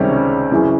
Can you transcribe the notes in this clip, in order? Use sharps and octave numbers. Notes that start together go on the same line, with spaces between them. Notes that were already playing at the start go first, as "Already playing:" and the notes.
Already playing: C#2 C3 D#3 G3 C#4
C#4
F#2 C#3 E3 C4